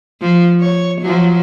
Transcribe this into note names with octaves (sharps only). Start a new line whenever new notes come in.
F3
C#5
F3 F#3